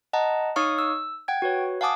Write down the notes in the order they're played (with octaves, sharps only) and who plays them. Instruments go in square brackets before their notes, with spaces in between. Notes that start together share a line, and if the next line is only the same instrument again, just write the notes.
[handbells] D#5 F#5 A5 A#5
D#4 C#5 F5 C#6 D#6 F6
E6
F#5 G5 G#6
F#4 B4 C#5
F5 F#5 G#5 A5 D6 D#6